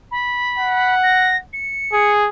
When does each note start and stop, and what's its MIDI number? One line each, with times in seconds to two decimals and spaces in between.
0.11 0.94 83
0.58 1.42 78
1.03 1.36 94
1.53 2.11 97
1.93 2.29 68